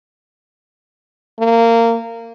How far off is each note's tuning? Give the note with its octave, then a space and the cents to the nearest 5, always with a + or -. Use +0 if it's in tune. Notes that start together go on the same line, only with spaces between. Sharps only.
A#3 -20